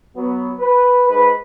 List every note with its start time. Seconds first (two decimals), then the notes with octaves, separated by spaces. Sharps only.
0.15 F#3 B3
0.60 B4
1.09 G#2 B4